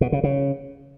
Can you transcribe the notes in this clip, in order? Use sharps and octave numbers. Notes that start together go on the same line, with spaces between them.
B2
C#3
C#3